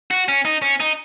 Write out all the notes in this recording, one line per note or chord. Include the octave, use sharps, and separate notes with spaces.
F#4
C#4
D#4
C#4
D#4